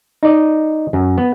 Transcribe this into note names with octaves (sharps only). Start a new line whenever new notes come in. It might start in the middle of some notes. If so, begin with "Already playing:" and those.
D#4 D5 D#5
F#2
B3